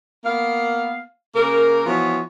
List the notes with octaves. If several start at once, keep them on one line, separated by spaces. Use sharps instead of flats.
A#3 B3 F5
C#3 A#3 A#4
E3 F3 B3 F#4 C#5